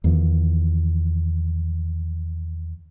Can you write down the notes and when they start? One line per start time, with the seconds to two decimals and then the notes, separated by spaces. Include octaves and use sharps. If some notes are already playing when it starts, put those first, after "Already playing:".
0.04 E2 D#3 F3